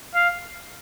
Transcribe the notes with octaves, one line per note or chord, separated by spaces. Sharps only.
F5